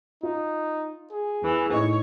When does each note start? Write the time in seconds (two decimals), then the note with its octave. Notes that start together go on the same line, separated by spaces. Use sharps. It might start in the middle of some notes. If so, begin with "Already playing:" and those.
0.23 D#4 F4
1.12 G#4
1.42 E2 E3
1.71 A2 D#4 C#5